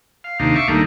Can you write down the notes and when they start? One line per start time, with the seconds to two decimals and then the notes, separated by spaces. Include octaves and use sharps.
0.24 F5
0.40 D#2 C3 D4 D#4 F5
0.55 E5 F5 C#6 D6
0.68 D#2 G3 A3 A#3 D4 D#4